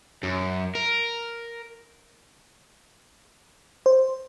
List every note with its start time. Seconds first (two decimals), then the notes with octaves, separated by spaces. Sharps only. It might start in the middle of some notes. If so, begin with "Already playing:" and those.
0.23 F#2
0.75 A#4
3.86 C5